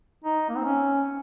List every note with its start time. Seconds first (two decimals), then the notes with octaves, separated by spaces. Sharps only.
0.24 D#4
0.49 A#3
0.57 C4
0.64 C#4